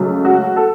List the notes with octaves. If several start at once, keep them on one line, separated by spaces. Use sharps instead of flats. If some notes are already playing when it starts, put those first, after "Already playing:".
Already playing: C#2 C#3 F#3 A3
F#4
A4